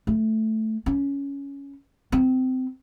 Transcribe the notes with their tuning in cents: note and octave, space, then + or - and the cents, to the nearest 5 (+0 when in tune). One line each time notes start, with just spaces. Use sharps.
A3 -5
C#4 +10
C4 -25